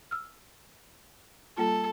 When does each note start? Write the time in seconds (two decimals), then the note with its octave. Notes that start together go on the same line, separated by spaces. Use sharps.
0.11 E6 F6
1.58 G3 A#3 F4 A4